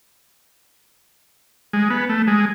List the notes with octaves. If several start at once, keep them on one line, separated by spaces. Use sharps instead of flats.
G#3
B3
A3
G#3